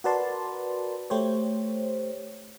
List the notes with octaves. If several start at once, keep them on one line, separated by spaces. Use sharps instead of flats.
F#4 A#4 B4 D5 A5 C6
A3 G4 C5 C#5